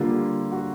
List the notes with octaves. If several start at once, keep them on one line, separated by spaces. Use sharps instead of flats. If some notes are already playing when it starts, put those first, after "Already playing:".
Already playing: D3 G3 A#3 F4
F#4